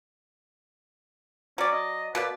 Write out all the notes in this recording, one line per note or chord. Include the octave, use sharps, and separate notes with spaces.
F#3 C#4 D5
D#5
B2 A#3 B4 D5